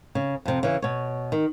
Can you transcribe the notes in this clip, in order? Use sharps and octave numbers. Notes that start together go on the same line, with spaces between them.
C#3
F2 C3
C#3 E3
B2 C#5
D#3